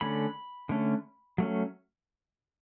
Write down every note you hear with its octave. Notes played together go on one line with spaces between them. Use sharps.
D3 A3 C#4 B5
D3 A3 C#4
F#3 A3 C#4